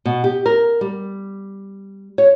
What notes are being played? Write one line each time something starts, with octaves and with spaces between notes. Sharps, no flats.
B2
G4
A#4
G3
C#5